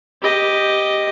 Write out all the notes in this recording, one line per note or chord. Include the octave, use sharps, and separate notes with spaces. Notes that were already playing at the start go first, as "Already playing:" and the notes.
G4 D#5